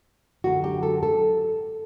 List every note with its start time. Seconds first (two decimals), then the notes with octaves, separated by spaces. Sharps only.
0.44 F#2 D3 F#3 F#4
0.64 G4
0.83 A4
1.03 A4